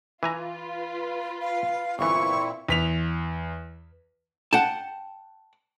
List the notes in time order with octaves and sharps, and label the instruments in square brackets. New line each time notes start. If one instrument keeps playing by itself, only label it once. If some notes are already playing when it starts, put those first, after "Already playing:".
[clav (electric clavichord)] E3 G#5 A#5 [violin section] F4 B4
[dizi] F5
[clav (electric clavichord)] G1 E3 [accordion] A#2 C4 E4 [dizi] C#6
[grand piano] E2 B6 F7
[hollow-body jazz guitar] F#5 G5 A5